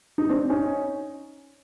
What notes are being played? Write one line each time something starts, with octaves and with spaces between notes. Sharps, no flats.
D#4
C4 D4
C#4 D#4